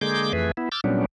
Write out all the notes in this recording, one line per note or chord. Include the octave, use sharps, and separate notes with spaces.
D3 G#3 A#3 G#4 D6 G6
F2 E3 A3 G#4 B4
B3 E4
D6 E6 F6 G6 A6
A#2 F#3 G3 B3 C#4 D4